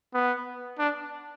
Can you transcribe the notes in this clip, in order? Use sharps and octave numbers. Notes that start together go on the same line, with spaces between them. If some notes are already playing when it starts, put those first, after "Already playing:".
B3
D4